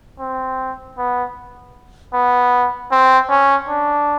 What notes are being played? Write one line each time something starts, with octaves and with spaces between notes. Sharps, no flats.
C4
B3
B3
C4
C#4
D4